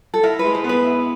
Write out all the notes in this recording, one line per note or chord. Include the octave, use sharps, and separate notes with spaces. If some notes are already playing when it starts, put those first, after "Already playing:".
A4
E4 A#4
B4
G#3
C5
B3
B4
E4